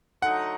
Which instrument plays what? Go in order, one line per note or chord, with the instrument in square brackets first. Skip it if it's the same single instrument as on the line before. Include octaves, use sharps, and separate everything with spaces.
[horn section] D3 F#3 A3 D#4 [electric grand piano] F#5